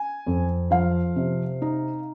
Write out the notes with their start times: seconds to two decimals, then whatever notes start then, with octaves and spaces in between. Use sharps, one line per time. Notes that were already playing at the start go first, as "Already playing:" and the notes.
Already playing: G#5
0.26 F2
0.71 F3 F5
1.16 C3
1.62 D#4